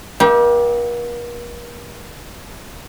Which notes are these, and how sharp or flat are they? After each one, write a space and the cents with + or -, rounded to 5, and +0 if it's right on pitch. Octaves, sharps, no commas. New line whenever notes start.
A#3 +45 D#4 +45 G4 +0